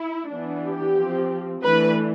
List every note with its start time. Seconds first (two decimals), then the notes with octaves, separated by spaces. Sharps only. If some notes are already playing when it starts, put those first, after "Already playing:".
Already playing: E4
0.30 E3 B3 D4
0.64 G4
0.97 F3 C4
1.62 E3 A3 D4 B4